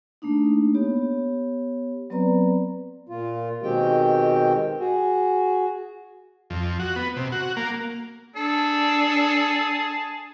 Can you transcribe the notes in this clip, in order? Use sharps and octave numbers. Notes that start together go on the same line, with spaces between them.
A3 A#3 D4 D#4
B3 G4 C#5
F#3 B3 C4 B4 D5 A#5
A#2 F4
B2 D#3 G#3 C4 G4 G5
F#4 G#4
F2
F#4
B3
C3
F#4
A#3
D4 G#4 A4 A5